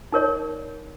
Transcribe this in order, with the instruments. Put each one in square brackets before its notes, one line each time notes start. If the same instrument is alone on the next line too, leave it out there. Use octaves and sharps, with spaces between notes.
[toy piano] D#4 A#4 C#5 D5